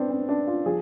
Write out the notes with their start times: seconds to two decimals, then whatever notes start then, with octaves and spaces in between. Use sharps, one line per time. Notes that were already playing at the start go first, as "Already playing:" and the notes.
Already playing: A2 B3 C4 D4
0.10 C4
0.29 D4
0.47 F4
0.66 F3 G#4